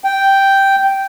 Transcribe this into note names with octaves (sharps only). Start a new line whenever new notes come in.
G5